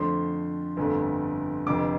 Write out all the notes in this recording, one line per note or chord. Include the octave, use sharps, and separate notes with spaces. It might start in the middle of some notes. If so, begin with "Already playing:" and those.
Already playing: F2 D3 F3 A3 C6
G1 F2 D3 A3
F1 F2 D3 D6